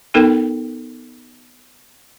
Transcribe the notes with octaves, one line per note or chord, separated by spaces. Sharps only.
B3 D#4 A4 A#4 G5